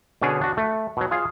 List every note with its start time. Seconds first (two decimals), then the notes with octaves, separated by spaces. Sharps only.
0.22 B2 D3 C#4 D4 G#4
0.41 D4 F#4
0.57 A3
0.97 B2 F#3
1.11 F4 G#4 F5